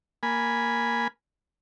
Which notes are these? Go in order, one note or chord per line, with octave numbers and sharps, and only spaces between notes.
A#3 G#5 B5